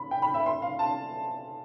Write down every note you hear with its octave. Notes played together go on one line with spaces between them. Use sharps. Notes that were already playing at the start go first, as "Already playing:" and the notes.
Already playing: B5
G5
B5
E5
C6
F5
A5